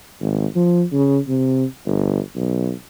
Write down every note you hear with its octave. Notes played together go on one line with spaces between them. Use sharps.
G#1
F3
C#3
C3
G1
B1